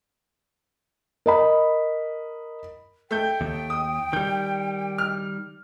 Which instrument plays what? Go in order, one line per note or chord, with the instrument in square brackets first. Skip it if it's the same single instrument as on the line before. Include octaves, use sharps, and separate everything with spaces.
[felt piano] A#4 D#5 B5
[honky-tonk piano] A3 G6 [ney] G5
[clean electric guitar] D#2
[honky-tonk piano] D#6
[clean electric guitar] D#3 G3 [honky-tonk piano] G6
[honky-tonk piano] F6